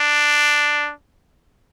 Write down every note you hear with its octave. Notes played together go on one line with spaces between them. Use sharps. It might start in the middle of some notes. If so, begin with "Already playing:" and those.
Already playing: D4